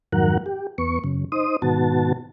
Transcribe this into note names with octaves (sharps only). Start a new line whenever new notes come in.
F2 G#2 D#3 F#3 A#4 F#5
G4
E2 B3 C#6
F#2 C#3
D#4 C5 D#6
G#2 B2 D#3 B3 F#4 A5